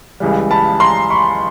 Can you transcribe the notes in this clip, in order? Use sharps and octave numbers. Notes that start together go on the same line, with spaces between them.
C#2 C#3 E3 G3
A5 B5
A#5 C6
B5 C#6